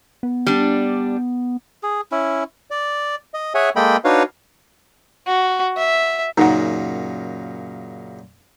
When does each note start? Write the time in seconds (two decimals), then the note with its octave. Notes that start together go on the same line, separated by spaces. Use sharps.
0.23 B3
0.47 G3 D4
1.83 G#4
2.12 C#4 E4
2.71 D5
3.34 D#5
3.55 G#4 C#5 E5 F#5 G#5
3.76 G#3 A#3 A4 D#5 G5 B5
4.04 D4 D#4 F#4 B4 C#5 F5
5.27 F#4
5.77 E5
6.38 F#2 A#2 C#3 D#4 F#5